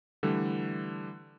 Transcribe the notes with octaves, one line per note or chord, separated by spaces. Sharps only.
D3 E3 G3 A3